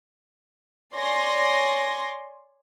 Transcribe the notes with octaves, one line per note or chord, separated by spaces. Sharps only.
C#5 D5 G#5 C6 A#6